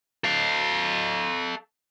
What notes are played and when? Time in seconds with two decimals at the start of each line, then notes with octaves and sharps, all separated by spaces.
0.24 A4 F5